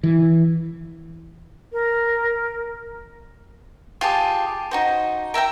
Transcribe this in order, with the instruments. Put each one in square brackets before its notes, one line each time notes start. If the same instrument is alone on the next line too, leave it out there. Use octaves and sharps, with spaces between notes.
[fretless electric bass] E3
[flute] A#4
[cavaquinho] F4 G4 G#4 A5
D#4 F#4 C5
A#4 E5 G5 A#5